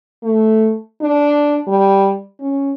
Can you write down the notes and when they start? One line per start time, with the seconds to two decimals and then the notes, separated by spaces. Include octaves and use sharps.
0.24 A3
1.02 D4
1.67 G3
2.40 C#4